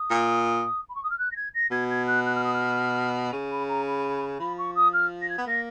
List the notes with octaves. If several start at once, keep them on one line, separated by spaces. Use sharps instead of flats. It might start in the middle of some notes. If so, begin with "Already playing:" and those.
Already playing: D#6
A#2
B5
C#6
D#6
F6
F#6
A#6
G#6
A#6
B2 G#6
G#6
F#6
F#6
F6
D#6
F6
C#3
B5
A#5
B5
F3 B5
C#6
D#6
F6
A#6
G#6
B3
A#3 A#6